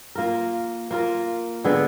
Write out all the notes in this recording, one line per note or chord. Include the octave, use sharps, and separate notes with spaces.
A#3 F4 A#4
A#3 F4 A#4
D3 G#3 B3